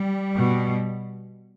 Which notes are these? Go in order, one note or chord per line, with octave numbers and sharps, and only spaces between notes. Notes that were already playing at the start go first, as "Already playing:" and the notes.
Already playing: G3
B2